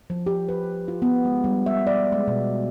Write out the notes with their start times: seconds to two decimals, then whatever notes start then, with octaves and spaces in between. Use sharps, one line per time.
0.10 F3
0.26 G4
0.49 B4
0.88 F4
1.02 B3
1.25 G#3
1.44 G3
1.66 E5
1.87 D5
2.12 G#3
2.28 B2